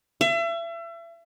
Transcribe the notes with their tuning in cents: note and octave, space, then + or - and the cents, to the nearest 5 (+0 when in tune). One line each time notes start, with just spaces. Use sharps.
E5 +35